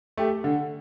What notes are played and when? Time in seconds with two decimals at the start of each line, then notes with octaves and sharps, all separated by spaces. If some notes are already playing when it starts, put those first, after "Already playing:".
0.17 A3 G4
0.44 D3